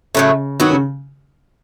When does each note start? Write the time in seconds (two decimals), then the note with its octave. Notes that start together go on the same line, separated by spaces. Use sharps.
0.15 A2 C#3 F#3 A3
0.60 D#3 F#3 B3 F#4
0.70 C#3